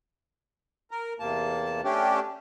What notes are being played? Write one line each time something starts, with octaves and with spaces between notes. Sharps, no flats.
A#4
E2 C3 A#3 A5
A3 C#4 D4 G4